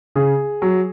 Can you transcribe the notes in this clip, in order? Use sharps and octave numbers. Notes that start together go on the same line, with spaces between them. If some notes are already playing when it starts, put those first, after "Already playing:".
C#3 G#4
F#3